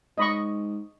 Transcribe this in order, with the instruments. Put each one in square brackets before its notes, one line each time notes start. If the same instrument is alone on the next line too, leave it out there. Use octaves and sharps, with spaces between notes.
[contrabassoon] G#2 [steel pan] D#5 B5 C#6